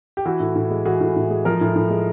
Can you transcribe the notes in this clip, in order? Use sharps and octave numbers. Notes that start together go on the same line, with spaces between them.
G4
E3 E4 F#4
A2
A2
G#3
E3 F#4 G#4
A2
A2
G#3
F3 G#4 A#4
A2
A2
G#3